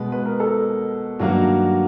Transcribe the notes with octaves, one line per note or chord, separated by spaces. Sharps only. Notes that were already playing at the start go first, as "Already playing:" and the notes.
Already playing: B2 G#3 B3 B4
B4
A#4
A4
G2 D#3 F#3 A#3 F#4